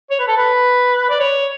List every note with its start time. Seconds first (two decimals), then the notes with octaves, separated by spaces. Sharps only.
0.10 C#5
0.20 B4
0.28 A4
0.36 B4
1.10 D5
1.20 C#5